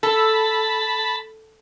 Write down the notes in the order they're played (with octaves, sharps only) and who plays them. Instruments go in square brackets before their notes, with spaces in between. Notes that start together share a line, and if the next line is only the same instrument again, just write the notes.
[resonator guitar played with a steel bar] A4 [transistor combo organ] A5 B5